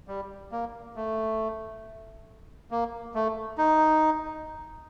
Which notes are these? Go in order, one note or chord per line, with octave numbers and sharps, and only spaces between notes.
G3
A#3
A3
A#3
A3
D#4